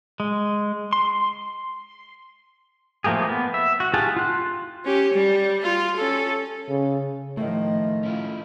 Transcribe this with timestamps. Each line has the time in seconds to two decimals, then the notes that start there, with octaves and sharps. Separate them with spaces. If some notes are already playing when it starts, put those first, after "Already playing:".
0.20 G#3
0.93 C6
3.04 F3 A3 A#3 G4 G#4
3.28 B3
3.54 E5
3.80 F#4
3.94 F4 G4 G#4 F#5 A5
4.17 F4 F#6
4.85 C#4 G4
5.14 G3
5.62 F4
5.96 C#4 A4
6.69 C#3
7.37 A2 D#3 F3 A3
8.03 C#4 E4 F4